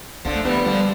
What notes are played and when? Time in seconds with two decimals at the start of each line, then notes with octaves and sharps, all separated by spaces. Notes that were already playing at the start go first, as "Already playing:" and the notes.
0.25 D3 F3 C4
0.35 A3
0.44 E3 G3 B3
0.65 D3 F3 G3